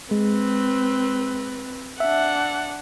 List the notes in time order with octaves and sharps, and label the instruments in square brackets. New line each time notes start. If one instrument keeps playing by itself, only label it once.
[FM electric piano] G#3 [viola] C4 B4
[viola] D4 F#5 [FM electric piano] E5